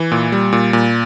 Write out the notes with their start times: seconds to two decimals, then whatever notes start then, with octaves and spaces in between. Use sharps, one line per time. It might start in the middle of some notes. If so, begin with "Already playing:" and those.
Already playing: E3
0.12 A#2
0.32 G3
0.53 A#2
0.73 A#2